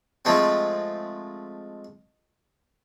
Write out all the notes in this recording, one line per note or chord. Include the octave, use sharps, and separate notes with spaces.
F3 G#3 A3 C4